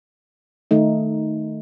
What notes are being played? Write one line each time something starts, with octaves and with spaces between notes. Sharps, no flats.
D#3 A3 D#4